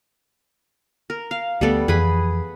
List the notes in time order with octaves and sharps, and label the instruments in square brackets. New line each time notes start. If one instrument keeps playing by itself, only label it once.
[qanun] A#4
F5
[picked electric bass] D2 A3 [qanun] G3 B3 A4
[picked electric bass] F2 E3 [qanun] G#4 B4 B5